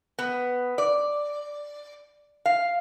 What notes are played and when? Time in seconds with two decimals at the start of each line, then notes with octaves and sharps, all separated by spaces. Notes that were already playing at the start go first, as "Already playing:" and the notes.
0.19 B3
0.78 D5
2.46 F5